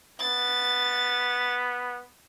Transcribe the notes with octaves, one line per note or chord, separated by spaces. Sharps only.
B3 A6